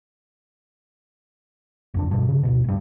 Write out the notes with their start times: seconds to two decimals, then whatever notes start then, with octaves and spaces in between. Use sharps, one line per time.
1.94 F#1 F2 D4
2.11 G2 B2
2.29 C#3
2.43 D1 A#1 B2
2.64 E1 G2